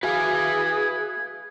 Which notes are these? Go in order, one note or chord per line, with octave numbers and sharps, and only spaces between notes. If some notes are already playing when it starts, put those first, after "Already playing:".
F#4 G#4 B4 E5 F5 G#5 G#6